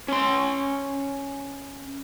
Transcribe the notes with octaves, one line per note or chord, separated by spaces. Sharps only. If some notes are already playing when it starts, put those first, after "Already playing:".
C#4 C6